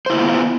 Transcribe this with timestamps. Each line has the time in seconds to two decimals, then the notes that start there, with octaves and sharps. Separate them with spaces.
0.06 C5
0.10 E4
0.13 A#3
0.17 F4
0.20 B3